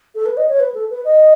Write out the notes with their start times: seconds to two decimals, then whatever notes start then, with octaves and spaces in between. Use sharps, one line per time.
0.15 A4
0.26 B4
0.37 D#5
0.49 C#5
0.60 B4
0.74 A4
0.90 B4
1.05 D#5